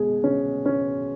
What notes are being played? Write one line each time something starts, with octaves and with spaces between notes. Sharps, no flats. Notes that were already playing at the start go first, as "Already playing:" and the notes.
Already playing: B2 G#3 G#4
C#4
C#4